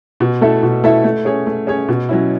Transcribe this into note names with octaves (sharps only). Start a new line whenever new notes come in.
B2
A3 E4 A4 E5
B2
A3 E4 A4 E5
A3
C#4 G#4 C#5
A3
C#4 G#4 C#5
B2
F#3 C#4 E4